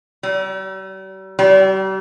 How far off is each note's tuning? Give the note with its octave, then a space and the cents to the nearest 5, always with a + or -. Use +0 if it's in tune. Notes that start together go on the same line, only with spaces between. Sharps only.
G3 -45
G3 -40